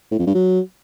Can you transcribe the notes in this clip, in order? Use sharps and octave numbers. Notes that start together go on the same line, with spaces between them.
A2
F2
G2
F#3